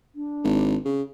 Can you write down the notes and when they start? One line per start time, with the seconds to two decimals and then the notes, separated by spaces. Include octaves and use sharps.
0.15 D4
0.44 G#1
0.85 C#3